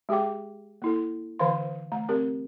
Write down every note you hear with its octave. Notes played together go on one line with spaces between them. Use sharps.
G#3 G4 G#4 G5 D6
A#3 E4 A4
D3 E3 B4 C5 F5 C6
A3 A#5
C4 G4 A#4